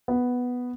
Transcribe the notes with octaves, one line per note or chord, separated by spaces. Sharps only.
B3